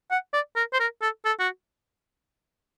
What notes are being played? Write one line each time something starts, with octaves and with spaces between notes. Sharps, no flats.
F#5
D5
A#4
C5
A#4
A4
A4
F#4